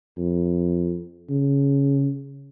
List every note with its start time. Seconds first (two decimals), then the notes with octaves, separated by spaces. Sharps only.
0.17 F2
1.29 C#3